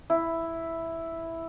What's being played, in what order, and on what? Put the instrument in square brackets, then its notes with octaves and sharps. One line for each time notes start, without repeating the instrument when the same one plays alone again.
[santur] E4